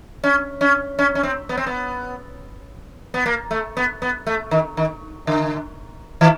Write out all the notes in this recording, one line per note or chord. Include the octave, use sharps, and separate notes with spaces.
C#4
C#4
C#4
C#4
C4
B3
C4
B3
B3
A#3
A3
B3
B3
A3
D#3
D#3
D3
D#3